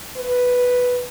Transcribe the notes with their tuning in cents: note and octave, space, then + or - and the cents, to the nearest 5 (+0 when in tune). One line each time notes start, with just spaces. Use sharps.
B4 +0